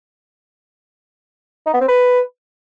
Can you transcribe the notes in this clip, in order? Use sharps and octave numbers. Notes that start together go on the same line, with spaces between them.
D#4
B3
C4
B4